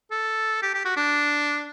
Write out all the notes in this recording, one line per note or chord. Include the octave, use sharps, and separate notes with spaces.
A4
G4
G4
F#4
D4